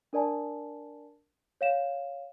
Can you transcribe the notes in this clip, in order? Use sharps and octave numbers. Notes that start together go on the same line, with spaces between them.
D4 A#4 D5 G#5 A5
C#5 F5 E7